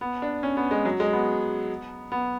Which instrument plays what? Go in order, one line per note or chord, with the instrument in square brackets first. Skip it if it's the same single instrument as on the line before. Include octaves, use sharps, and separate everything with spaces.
[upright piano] B3
D4
C#4
B3
G#3
F#3
G#3
B3
B3